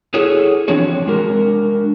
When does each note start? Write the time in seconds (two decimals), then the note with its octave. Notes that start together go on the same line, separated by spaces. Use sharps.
0.14 E4 F#4 G#4 A4 C#5
0.68 E3 F3 C4 D4 F#4 C#5
1.07 G#3 D4 F#4 A#4